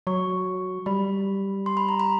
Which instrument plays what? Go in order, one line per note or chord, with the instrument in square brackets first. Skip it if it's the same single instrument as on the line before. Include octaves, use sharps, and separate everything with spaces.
[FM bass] F#3 [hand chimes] C#6
[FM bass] G3 [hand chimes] B5
[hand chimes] C6
B5
A#5
B5